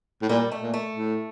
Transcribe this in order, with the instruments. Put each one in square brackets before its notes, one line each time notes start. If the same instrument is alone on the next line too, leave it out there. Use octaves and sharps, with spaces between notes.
[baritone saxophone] A2
[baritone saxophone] A#2 [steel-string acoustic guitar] G3
[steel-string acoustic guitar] A3
[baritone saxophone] A#2
[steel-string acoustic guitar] A3
[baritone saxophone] A2